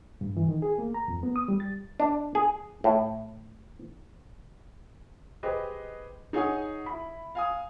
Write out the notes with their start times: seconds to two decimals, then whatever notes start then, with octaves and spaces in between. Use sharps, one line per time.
0.21 G2
0.37 E3
0.48 D#3
0.62 G#4
0.79 A#3
0.94 A#5
1.08 F2
1.23 B3
1.36 D#6
1.48 G3
1.60 A6
2.00 D4
2.35 G#4
2.84 A2
5.43 G4 G#4 B4 C5 D#5
6.33 D#4 G#4 C#5 F#5 G#5 D#6
6.86 E4 B5
7.35 F5 G#5 D#6